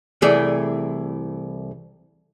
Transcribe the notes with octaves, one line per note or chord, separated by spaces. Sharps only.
C2 E3 A3 G#4 D5